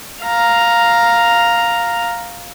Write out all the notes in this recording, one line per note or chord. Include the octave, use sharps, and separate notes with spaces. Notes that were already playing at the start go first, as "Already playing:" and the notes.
F5 A#5